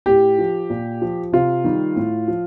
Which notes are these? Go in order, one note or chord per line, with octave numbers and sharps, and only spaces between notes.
A2 G4
F3
A#2
F3
C3 F4
D#3 G3
A2
F3